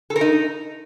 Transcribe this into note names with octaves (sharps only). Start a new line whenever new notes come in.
A4
A#4
D#4